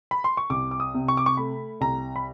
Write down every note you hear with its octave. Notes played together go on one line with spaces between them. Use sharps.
B5
C6
C#6
C2 D6
D6
D#6
C3
C#6
D6
C#6
A3 B5
C2 A#5
B5